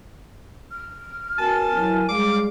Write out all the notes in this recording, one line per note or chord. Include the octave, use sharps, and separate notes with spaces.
F6
B3 C#4 F#4 A#4 G#5 A5
E3 F#3
G3 G#3 F5 D6